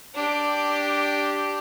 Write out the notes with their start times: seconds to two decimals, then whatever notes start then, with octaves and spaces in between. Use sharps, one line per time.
0.15 D4 G4